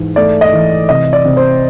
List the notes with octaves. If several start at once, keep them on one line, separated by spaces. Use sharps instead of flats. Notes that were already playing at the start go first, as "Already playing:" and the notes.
Already playing: G#2 E3
A3 D5
D#5
E3
C3 D#5
D5
C3
C5